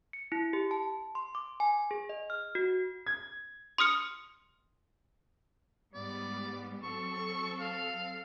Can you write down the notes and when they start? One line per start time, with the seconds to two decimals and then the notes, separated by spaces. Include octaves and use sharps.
0.13 C#7
0.32 E4
0.53 G4
0.71 A5
1.15 C6
1.35 D6
1.60 G#5
1.91 G#4
2.09 D#5
2.30 F6
2.55 F#4
3.06 G#6
3.78 C6 D#6 F6 C#7
5.94 G#2 G3 B3 D5
6.83 F#3 C4 A4 C#6
7.60 F5